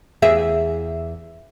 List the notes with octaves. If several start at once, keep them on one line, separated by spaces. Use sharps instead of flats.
E2 G#4 E5